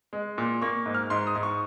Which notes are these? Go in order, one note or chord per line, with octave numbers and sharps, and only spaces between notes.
G#3
A#2
A#3 C#6
G#2
F6
G#2 C6
D#6
G#2
C#6